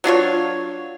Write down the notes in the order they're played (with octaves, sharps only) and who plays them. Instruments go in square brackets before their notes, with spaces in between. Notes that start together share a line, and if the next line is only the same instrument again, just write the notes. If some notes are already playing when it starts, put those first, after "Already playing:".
[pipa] F#3 D4 F4 C#5